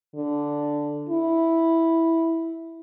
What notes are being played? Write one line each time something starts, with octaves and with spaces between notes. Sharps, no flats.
D3
E4